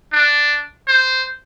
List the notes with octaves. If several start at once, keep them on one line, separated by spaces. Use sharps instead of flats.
D4
C5